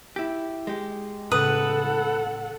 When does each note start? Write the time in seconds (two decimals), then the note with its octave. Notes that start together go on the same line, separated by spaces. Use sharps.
0.16 E4 G4
0.67 G#3 G4
1.31 A2 C#3 A4 B4 F#5 D#6